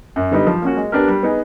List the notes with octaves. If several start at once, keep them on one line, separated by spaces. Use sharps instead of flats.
F#2
D3 G3 B3 D#4
F3
A#3 C#4 F#4
G#3
B3 D4 G4 A#4
G3
B3 D#4 G#4